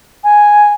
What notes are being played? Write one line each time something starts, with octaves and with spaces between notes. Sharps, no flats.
G#5